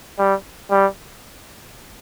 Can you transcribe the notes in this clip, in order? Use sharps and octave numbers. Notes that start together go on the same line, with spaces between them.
G3
G3